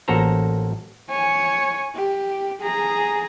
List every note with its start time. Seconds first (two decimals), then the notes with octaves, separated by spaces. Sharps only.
0.08 A1 A#3 F#4 A4 C5 A#5
1.10 C#5 G#5
1.95 G4
2.61 G#4 A#5